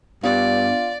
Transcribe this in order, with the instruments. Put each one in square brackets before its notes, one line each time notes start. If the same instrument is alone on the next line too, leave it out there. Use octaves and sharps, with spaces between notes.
[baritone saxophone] G2 [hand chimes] B3 D4 [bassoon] F4 [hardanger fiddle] D5